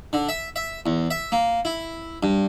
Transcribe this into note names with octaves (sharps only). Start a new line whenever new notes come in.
D3
E5
E5
E2
E5
A#3
E4
G2